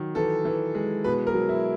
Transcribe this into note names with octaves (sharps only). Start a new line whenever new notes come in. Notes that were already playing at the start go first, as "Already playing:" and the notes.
Already playing: D#3 F#3
E3 A4
E3
G#3
B2 B4
A#4
F#3
E4